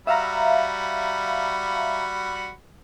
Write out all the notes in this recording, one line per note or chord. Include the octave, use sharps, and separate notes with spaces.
G3 F#4 E5 F5 A#5 B5